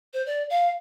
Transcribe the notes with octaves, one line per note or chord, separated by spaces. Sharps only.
C5
D5
F5